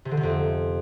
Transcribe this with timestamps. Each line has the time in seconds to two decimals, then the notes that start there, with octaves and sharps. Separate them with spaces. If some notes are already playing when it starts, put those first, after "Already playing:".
0.05 C3
0.11 D3
0.17 C3
0.23 F2